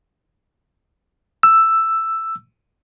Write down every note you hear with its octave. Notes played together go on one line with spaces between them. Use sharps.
E6